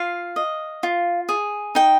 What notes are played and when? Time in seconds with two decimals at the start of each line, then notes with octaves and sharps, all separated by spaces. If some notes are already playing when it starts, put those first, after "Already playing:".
Already playing: F4 F5
0.36 D#5
0.83 F4
1.29 G#4
1.75 D#4 G5